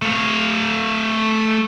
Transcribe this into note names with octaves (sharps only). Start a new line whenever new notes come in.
A3 F5